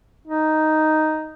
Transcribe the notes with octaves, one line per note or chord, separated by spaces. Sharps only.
D#4